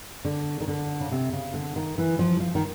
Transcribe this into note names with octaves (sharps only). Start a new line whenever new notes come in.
D3
D#3
D3
C#3
C3
C#3
D3
D#3
E3
F3
F3
D#3